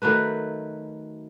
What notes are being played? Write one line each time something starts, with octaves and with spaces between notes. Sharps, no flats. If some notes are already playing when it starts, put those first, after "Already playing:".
D#3 F#3 A3 B4